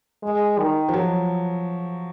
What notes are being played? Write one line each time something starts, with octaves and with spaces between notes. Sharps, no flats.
G#3
D#3
F3
F#3